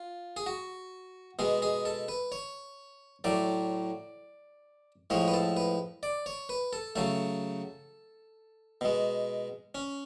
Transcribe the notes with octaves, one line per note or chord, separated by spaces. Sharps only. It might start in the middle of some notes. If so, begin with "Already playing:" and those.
Already playing: F4
G#4
F#4
B2 G#3 G#4
G#4
A4
B4
C#5
A2 F#3 A3 D5
A2 F3 G#3 C#5
B4
A4
B4
D5
C#5
B4
A4
C#3 F#3 A3 A4
B2 G#3
C#4